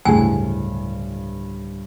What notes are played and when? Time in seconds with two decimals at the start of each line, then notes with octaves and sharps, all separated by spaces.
0.05 D1 G2 C#3 A3 E4 G#4 G#5